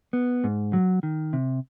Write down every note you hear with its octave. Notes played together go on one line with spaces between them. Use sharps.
B3
G#2
F#3
D#3
C3